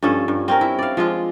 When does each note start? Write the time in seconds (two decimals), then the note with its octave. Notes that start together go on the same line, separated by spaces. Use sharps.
0.03 G2 F3 C#4 A4
0.28 G2
0.48 C4 C#4 A#4
0.61 E4
0.79 D5 F5
0.97 F3 G#3 F4